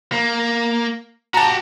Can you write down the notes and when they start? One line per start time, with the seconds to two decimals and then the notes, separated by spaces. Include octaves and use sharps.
0.12 A#3
1.34 F#4 G4 A5 A#5